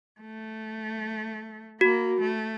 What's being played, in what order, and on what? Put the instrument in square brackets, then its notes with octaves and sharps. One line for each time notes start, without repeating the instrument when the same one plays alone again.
[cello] A3
[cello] A#3 [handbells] F#4
[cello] A3